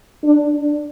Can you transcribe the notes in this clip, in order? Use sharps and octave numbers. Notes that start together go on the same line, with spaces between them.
D4